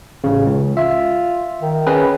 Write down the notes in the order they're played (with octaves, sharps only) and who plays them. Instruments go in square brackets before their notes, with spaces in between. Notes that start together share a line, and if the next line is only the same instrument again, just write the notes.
[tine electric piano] A1 C#3
C#2
[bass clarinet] F4 [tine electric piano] E5
[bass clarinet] D#3
[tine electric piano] C#4 G#4 B4